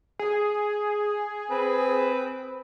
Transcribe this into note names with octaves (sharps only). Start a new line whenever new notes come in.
G#4
C4 B4